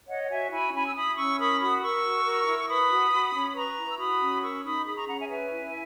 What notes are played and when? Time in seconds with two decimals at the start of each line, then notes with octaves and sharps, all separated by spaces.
0.08 C#5 D#5 F#5
0.23 F#5
0.30 F#4 E5 G#5
0.52 E4 G#5 B5
0.73 C#4 G#5 B5
0.86 E6
0.95 E4 B5 D#6
1.16 C#4 C#6 E6
1.39 A#4 B5 D#6
1.60 F#4 B5 D#6
1.78 D#6
1.82 A#4 C#6 E6
2.03 F#4
2.25 A#4
2.46 E4
2.59 C#6
2.68 B4 B5 D#6
2.90 F#4
3.12 F#4
3.34 C#4
3.55 B4 A#5 C#6
3.77 E4
3.89 E6
3.98 F#4 B5 D#6
4.20 C#4
4.41 A#4 C#6 E6
4.63 D#4 B5 D#6
4.85 G#4 B5 D#6
4.95 A#5 C#6
5.06 C#4 F#5 A#5
5.18 E5 G#5
5.28 B4 E5 G#5
5.50 E4